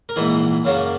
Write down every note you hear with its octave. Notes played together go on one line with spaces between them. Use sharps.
A#4
A#1 G#2 E3 B3 D#4 G#4
F#2 C#3 F#3 A#3 C#4